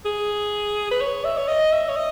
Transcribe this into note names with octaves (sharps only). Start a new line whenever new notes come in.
G#4
B4
C#5
E5
C#5
D#5
E5
C#5
D#5